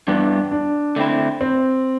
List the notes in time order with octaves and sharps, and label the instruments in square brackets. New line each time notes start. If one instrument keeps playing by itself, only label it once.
[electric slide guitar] G2 E3 B3 [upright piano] D4
[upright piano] D4
[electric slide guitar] D3 A3 C4 E4
[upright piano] C4